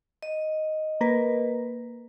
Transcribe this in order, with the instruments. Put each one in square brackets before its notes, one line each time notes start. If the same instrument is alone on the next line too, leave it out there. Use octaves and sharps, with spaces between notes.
[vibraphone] D#5
[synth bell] A#3 A#4 B4